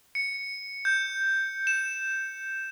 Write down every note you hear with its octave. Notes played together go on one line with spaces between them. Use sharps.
C#7
G6
E7